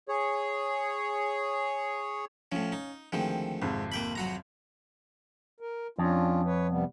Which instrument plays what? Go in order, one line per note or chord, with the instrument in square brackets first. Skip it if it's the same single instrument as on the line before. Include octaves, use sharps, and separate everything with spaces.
[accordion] G#4 C#5
[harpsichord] A2 F3 [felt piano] C#4 F5
[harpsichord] D#4
[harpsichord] D2 D#3 F3 [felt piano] G#3 C4 G5
[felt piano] G#1 F2 C3 [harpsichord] G#2
[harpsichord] A#3 G5 B5
F#3 F#4 A#5
[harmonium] A#4
[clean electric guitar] F2 [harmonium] C#4 D4 F4
[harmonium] B4 C#5
C3 G3 B3